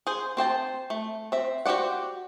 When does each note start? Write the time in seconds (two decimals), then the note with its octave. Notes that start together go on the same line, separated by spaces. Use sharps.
0.07 G#4 C5
0.37 C4 C5 G5 A5
0.90 A3
1.32 C4 E5
1.65 F#4 G4 C5 D5 F#5